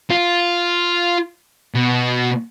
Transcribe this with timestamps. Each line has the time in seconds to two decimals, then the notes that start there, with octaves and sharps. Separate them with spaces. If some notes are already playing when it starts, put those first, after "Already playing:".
0.10 F4
1.75 B2